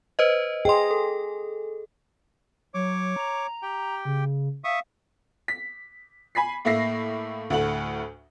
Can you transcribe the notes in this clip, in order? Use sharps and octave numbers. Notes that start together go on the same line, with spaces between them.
B4 C5 D#5
G#4 D#5 G5 C6
A4
F#3 C#5 D6
A#5
G4 G5
C#3
E5 F5 C#6 D#6
B6
G#5 B5 B6 C7
A2 A#3 E5 A#6 C7
D2 A2 A3 F#5 F#7